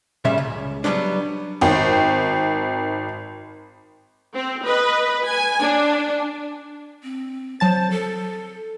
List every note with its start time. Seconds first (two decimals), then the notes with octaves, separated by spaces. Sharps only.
0.25 A#2 C#3 G3 E5
0.38 C#2
0.84 F#3 G3 A3 B3 D4
1.61 G#1 G5
4.34 C4
4.65 B4 D#5
5.25 G#5
5.60 D4
7.03 C4
7.60 F#3 C5 A5 A6
7.91 A4